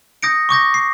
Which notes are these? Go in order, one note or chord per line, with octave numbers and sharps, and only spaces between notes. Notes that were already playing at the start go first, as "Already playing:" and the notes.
D#6 G6 A#6 C#7 D7
C#6 D6 G6 A#6
C7